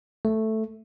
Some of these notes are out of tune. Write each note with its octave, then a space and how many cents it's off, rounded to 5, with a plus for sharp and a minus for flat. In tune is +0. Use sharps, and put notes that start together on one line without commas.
A3 +0